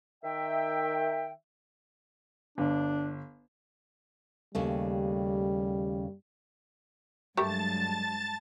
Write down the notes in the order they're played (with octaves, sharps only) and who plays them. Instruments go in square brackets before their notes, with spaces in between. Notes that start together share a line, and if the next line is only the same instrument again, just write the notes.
[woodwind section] D#3 E5 G5
[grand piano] G1 [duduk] D4
[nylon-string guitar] D#2 C#3 A3 [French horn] G3
[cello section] G2 F#3 G#3 [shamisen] A3 G4 A#4 [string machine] A5 A6